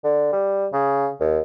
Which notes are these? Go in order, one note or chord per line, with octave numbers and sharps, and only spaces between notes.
D3
G3
C#3
D#2